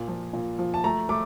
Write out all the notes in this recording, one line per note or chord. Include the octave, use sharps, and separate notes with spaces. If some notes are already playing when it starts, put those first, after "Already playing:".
Already playing: A#2
F3
A#2
F3
A5
A3 A#5
A3 D6